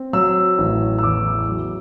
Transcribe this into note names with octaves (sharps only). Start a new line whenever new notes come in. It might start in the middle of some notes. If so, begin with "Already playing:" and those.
Already playing: C4
F#3 E6
A1
E6
E2 D6
F#3